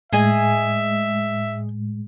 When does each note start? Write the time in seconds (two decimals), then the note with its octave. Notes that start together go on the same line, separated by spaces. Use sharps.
0.13 A2 G#3 G#4 D#5 E5 G#5